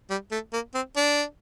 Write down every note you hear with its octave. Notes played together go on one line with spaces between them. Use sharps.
G3
A3
A#3
C4
D4